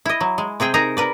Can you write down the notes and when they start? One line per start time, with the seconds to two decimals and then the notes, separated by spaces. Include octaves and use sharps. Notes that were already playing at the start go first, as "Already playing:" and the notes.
0.06 E4 D#5
0.21 F#3
0.38 G#3
0.60 C3 C4 G#4 G5
0.74 D#4 G#4 A#4 A#5
0.97 A#4 B4 D5